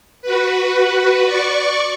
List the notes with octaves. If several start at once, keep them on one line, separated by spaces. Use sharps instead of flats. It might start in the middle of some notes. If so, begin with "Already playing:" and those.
F#4 B4
D5 C#6